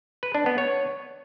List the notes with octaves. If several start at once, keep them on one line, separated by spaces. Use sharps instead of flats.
B4
D4
B3
C#5